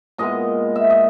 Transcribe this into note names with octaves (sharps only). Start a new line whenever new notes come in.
A#2 G#3 B3 D#5
E5
D#5